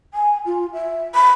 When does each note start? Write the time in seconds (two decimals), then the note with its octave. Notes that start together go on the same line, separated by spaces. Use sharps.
0.14 G#5
0.46 F4
0.73 E5
1.15 B5